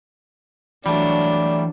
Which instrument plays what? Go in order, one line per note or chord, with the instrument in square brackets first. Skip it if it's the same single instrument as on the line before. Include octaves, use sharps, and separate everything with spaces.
[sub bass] E3 [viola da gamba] F#3 D4 [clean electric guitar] G3 A3 [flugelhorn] D5